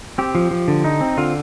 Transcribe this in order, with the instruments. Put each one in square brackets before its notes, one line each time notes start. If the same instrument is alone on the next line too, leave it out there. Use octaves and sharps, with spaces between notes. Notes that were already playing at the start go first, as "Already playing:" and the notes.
[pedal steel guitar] C4 G4
F3
F3
D3
D#4
C4
D3 F4